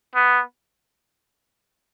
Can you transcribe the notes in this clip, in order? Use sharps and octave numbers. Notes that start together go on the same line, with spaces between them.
B3